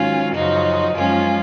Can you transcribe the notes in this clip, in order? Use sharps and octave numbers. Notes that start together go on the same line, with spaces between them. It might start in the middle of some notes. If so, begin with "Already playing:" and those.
Already playing: G#2 D#3 F#3 C#4 F4
F#2 C#3 F3 D#4 F#4
F#2 F3 G#3 C#4 F4